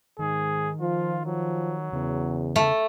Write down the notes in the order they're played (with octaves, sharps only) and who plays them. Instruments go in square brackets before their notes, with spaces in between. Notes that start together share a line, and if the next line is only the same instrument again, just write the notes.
[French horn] G#2 [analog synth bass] D#3 [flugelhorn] G#4
[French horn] F3 [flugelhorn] F4
[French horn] F3 [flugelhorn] F#3
[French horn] E2 [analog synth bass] C#3
[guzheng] A3